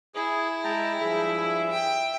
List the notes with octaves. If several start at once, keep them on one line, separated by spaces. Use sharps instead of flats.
E4 G#4
G#3 G#4 G5 A5 A#5
G2 F3 G#4 E5
G5